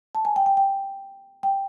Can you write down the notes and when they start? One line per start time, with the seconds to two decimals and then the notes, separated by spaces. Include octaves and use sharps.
0.15 A5
0.25 G#5
0.36 G5
0.46 G5
0.57 G5
1.43 G5